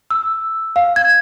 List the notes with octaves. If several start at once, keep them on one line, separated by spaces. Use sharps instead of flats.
E6
F5
G#6